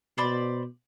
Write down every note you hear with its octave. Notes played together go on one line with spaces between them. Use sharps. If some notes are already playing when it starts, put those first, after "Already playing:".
B2 C5 D5 B5